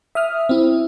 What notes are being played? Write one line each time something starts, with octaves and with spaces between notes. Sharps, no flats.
E5 D#6 F6
C4 E4